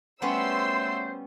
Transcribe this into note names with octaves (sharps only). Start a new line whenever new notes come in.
F#3 G3 A3 B3 C#4 C5 C6 E6